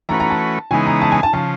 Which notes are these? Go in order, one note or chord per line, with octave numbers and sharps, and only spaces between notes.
E3 A3 C#4 F#4 B4 A#5
A#5
A5
C#3 E3 G#3 B3 D#4 G#5
A#5
A5
G#5
A5
C#3 F3 A5